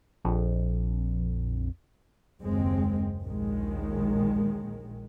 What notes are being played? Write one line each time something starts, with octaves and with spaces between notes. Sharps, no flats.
A#1 F2
F#1 D#2 G#3 C4
A#1 D#2 D#3 G#3